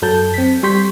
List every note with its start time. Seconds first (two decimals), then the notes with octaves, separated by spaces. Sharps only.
0.02 F#2 F#3 A4 A5 G6
0.34 C4 B6
0.63 G3 G4 C6 C#6 G6 B6